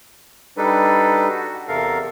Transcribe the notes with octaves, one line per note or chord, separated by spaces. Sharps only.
G3 D4 D#4 A4 B4
F#4
E2 C3 A4 A#4 F5